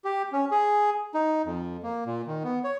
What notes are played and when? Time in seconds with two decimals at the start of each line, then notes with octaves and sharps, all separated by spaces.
0.05 G4
0.32 C#4
0.51 G#4
1.14 D#4
1.45 F2
1.83 A#3
2.06 A#2
2.27 D#3
2.44 B3
2.64 C#5